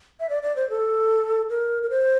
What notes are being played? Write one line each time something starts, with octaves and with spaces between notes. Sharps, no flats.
E5
D5
D5
C5
A4
A#4
A#4
C5